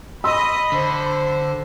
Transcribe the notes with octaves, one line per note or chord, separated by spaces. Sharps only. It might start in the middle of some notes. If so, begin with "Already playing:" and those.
D#5 B5 C6 E6
D3 C5